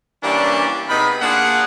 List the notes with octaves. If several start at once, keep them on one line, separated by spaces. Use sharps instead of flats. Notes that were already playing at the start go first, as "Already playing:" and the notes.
E3 G3 A#3 C#4 D4
C3 B3 D#4 G#4 B5
A#3 D4 F4 G#4 F5 F#5